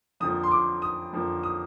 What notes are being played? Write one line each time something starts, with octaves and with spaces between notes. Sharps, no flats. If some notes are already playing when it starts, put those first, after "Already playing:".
F2 D3 F3 A#3 D#6
C6
D6
D#6
F2 D3 F3 A#3
D#6